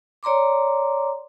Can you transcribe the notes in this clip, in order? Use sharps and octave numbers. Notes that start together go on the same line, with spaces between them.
C#5 D5 A#5 C6 D6